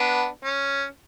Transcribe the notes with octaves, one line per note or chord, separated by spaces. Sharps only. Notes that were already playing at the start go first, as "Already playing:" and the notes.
Already playing: B3 D4
C#4